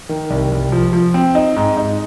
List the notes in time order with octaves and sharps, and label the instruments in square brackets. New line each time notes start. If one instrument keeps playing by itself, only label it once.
[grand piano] D#3
C2
C2
F3
F3
C4
D#4
G#2
D#4